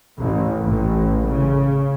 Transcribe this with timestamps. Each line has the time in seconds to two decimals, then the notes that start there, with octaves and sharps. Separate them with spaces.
0.19 A1
0.62 A1
1.27 C#3